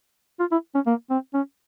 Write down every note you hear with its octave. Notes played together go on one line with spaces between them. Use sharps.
F4
E4
C#4
A#3
C4
C#4